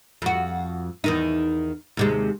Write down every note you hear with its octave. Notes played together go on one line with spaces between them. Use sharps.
F2 F#4
E2 D#3 D#4
D#2 C3 G#3